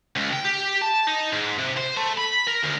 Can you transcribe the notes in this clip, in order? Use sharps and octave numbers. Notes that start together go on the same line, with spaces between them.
C#2
G5
G4
A5
D#4
G#2
C3
C5
A3
B5
A#4
D2